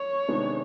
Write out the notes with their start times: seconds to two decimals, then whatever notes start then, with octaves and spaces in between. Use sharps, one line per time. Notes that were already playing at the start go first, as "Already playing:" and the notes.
Already playing: C#5
0.28 C3 D#3 G#3 B3 D4